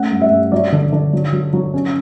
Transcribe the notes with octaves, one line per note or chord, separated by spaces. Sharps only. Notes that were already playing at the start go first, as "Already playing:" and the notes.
Already playing: A3 C#4 F#5
G2
E5
G2
F#3 D5
D3
D3
F#3
F#3
F#3
C#4